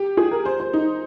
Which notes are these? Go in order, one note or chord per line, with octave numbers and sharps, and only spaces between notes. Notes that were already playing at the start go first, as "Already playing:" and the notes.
Already playing: G4
G#4
A#4
C5
C5
D#4